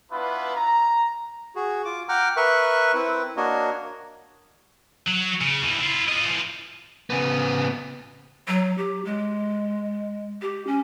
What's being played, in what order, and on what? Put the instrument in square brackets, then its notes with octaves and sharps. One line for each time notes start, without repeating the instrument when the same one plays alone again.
[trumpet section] B3 D4 E4 F4 B4
A#5
[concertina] F#4 G#4
F4 D6
F#5 G5 A#5 D6 F6
A#4 B4 E5 C#6 F#6
C4 E4 B4
A#3 D4 F#4 A#4 C#5 D#5
[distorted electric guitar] F#3
C#3
D#2 E3
E4 F4
F4 D#5
E3 F3
[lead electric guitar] C#3 B3
[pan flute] F#3
G4
G#3
G4
C#4